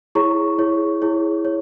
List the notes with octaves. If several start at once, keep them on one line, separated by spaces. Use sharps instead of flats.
E4 G#4 C#5 A#5 C#6
E4 G#4 C#5
E4 G#4 C#5
C#5